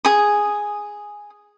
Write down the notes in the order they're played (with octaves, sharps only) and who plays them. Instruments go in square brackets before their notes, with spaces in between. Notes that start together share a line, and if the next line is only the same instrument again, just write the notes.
[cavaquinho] G#4 D#6